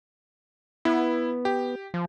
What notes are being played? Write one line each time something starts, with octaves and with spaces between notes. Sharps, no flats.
B3 E4
G4
F3